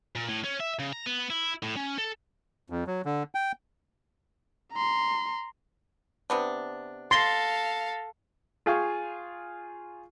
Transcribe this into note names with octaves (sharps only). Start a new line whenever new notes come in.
A#2
A2
C#4
E5
C#3
A#5
B3
E4
A2
C#4
A4
F2
F#3
D3
G5
A#5 C6
C3 B3 D4
A4 F5 C6 A6 A#6 G7
F4 G#4 F5 G5 G#5 C#6